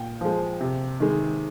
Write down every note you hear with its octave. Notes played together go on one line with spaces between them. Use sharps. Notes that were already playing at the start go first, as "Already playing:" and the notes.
Already playing: A#2 G5
F3 G#3
C3
D#3 G#3